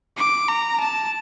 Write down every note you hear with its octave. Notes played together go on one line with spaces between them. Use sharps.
D6
A#5
A5